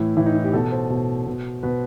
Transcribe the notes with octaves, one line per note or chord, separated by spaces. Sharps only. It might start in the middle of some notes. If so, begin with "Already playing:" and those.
Already playing: A2 E3 E4
A2 E3 E4
D#4
E4
G4
B2 A4
C5
B2
B2
B2 B4